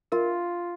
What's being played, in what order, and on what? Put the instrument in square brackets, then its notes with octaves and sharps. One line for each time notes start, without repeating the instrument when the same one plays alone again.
[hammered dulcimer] F4 [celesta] A#4